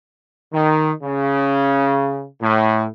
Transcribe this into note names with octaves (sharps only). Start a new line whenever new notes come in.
D#3
C#3
A2